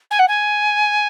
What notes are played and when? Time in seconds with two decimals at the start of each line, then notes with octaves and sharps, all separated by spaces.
0.10 G#5
0.19 F#5
0.28 G#5